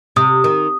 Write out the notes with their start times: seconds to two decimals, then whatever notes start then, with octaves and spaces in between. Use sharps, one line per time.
0.16 C3 D#6
0.44 D#3